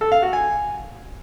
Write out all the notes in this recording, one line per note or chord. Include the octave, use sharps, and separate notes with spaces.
A4
F5
F#4
G#5